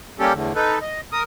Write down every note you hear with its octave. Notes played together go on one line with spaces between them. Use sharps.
G3 A#3 C#4 G4 A4
E2 A2 D3
D#4 A4 B4
D#5
A#4 D#6